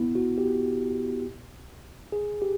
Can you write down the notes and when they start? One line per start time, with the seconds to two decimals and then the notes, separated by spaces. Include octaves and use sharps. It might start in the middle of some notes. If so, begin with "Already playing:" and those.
Already playing: B3 E4
0.15 F#4
0.38 G4
2.12 G#4
2.42 G4